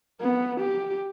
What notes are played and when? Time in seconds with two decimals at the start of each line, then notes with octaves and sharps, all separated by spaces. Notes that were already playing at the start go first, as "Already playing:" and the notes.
0.20 B3
0.60 G4